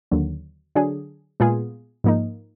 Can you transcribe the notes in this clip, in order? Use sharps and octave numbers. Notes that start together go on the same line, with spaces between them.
D#2 D3 F#3
D3 F#3 D4 G#4
A#2 G#3 B3 F4 G#4
G#2 F3 A#3 D#4